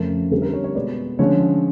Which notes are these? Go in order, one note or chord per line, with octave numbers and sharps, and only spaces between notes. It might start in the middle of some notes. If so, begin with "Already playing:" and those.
Already playing: F2 C#3 F3 A3 C#4 A#4
D3 G3 C4 A4
A#4
C#5
C#5
B2 G#3 B3 D5
D3 F3 G#3 C#4 C#5